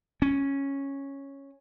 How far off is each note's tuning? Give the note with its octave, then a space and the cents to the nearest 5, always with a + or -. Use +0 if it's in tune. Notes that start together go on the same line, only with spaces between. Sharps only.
C#4 -5